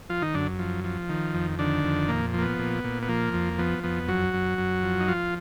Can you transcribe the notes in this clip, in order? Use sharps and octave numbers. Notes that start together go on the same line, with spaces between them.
F3 F4
D#3 D#4
F#2 D3 D4
F3
F3
D#3
F2
D3 D#3 D4
F2
A#2 A#3
F3 A#3
B3
A#2
A#2
B3
F3 A#3
F2
F3 B3
F2 B3
F#2 F#3 F#4
F#2
F#2
F3
D#4
F3 F4